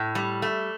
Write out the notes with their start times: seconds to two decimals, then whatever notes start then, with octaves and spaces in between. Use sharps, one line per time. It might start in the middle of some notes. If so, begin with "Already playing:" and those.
Already playing: A2
0.15 G3
0.42 A3